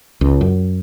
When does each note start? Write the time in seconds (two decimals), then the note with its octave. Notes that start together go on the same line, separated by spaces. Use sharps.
0.21 C#2
0.41 F#2